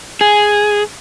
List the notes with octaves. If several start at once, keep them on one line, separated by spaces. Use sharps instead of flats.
G#4